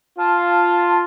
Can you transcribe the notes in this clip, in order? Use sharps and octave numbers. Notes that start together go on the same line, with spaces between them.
F4 A5